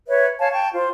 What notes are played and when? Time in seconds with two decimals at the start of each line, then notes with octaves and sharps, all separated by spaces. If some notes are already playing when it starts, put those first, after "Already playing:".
0.08 B4 C#5 E5
0.38 C#5 F5 G#5 A5
0.51 G5 A5 C#6
0.73 F4 C5